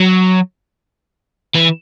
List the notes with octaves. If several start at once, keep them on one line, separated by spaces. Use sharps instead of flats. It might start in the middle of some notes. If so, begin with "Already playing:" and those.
Already playing: F#3
E3